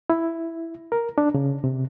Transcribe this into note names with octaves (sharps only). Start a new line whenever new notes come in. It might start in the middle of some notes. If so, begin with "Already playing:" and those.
E4
A#4
D4
C#3
C3